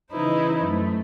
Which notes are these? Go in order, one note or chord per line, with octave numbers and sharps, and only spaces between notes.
C#3 E3 D#4 E4 B4 C5
F#2 A3